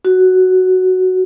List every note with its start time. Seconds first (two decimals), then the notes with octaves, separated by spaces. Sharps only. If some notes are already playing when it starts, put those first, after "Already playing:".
0.05 F#4